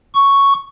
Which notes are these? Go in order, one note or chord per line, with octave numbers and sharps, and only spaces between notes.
C#6